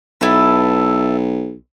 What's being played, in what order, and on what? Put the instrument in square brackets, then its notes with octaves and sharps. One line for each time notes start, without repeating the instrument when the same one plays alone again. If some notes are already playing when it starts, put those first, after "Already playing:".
[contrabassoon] B1 [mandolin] E4 A4 B4